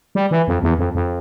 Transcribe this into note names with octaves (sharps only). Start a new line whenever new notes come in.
G3
E3
F2
E2
F2
F2